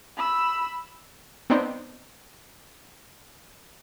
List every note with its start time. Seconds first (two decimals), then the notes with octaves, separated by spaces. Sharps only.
0.17 B5 E6
1.50 B3 C4 D4 D#4 C5